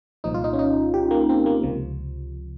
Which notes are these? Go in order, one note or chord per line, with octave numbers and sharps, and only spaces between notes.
C2 A#2 F3 D#4
F4
D#4
C#4
D#4
G4
A#3
C4
A#3
C#2 C3 F3